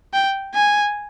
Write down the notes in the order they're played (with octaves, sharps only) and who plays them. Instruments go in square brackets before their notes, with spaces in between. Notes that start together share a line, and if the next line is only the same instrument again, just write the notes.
[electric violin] G5
G#5